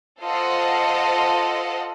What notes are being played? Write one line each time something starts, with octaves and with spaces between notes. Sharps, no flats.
F4 A4 C5 D#5 F#5